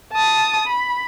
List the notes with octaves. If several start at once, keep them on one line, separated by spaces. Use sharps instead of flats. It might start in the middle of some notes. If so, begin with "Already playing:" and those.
A5 D#6
B5